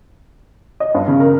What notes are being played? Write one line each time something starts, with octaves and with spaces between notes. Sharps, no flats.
D#5
G2
C#3
A#4